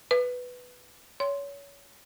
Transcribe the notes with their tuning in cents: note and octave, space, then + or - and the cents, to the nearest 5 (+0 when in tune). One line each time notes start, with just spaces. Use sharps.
B4 +5 D6 +45
C#5 +25 C6 +0